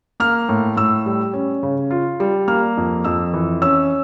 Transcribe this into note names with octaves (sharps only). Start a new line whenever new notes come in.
A#3 F6
A2
A2 E6
G3
C#4
C#3
F4
G3
A#3 F6
F2
F2 E6
E3
C#4 E6